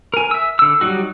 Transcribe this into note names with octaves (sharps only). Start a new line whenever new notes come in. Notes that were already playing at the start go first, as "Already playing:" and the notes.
A#4 G#5
E5 E6
D3 E6
F#3 G3 D#4 F#4